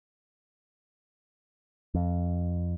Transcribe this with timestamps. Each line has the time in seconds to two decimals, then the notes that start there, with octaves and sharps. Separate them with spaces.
1.94 F2